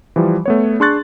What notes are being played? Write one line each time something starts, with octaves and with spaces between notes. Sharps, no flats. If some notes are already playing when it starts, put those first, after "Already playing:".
E3 F3 G3
A3 B3 C#5
D4 G#4 C6 C#6 F#6 A6